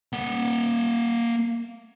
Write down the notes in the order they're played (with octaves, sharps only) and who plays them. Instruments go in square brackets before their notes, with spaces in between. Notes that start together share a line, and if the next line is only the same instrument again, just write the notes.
[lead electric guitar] A#3 F#5